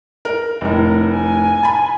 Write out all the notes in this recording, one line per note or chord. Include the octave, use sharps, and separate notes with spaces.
A#4
F1 A2 A#4
G#5
A5 B5